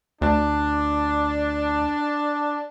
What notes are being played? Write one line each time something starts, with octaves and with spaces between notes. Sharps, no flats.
D2 D4